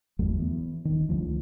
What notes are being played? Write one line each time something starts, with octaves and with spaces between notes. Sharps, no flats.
G1 E2 F#3 A3
E3 B3
D#1 D#3
C#2 D3 F3 A3